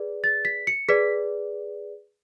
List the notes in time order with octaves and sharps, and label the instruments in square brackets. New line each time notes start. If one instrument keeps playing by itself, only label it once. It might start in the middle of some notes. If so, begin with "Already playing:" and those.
Already playing: [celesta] G#4 B4 D5
A6
B6
C#7
G#4 B4 D5 B6